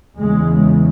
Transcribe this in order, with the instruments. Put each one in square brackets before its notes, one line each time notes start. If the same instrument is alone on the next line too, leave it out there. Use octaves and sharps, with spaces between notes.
[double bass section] E2 C#3 G#3